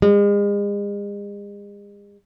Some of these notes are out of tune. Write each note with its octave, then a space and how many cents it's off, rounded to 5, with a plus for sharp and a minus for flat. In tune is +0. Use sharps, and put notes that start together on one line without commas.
G#3 -40